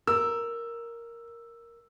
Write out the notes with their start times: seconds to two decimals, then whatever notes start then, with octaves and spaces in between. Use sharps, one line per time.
0.07 A#4 E6